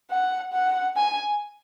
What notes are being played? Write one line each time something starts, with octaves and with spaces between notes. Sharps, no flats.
F#5
F#5
G#5